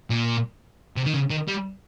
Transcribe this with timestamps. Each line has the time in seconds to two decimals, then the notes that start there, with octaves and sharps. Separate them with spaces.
0.10 A#2
0.97 C3
1.06 D#3
1.14 C#3
1.30 D#3
1.48 G3